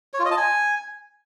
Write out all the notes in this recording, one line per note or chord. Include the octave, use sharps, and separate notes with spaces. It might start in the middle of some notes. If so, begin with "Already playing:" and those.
C#5
F4
D#5
A5
G#5